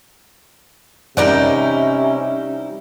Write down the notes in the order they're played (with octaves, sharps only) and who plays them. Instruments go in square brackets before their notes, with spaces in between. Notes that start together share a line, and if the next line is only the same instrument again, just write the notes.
[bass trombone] C3 [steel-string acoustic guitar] G3 D#4 E4 [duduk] C#4 [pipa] A#4 D5 F#5